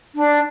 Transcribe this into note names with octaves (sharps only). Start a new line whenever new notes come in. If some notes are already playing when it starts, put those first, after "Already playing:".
D4